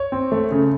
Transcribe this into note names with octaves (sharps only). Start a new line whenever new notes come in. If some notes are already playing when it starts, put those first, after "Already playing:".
Already playing: C#5
C4
A3
C#3